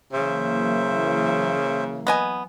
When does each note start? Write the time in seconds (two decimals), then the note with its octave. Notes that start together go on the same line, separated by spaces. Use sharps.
0.13 C#3 E3 F#3 A#3 C5 E5
2.07 B3 D#5 G#5